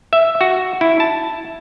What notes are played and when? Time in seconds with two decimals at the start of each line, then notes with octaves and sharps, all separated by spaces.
0.13 E5
0.41 F#4
0.81 E4
1.00 A5